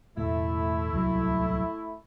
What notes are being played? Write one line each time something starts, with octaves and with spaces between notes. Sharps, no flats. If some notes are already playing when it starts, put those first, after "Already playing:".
E1 A2 A3 E4
D1 C2 F#3